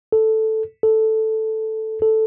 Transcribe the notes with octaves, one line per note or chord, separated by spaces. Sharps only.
A4
A4
A4